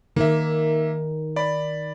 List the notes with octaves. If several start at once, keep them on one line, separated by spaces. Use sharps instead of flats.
D#3 A#3 E5
D5 B5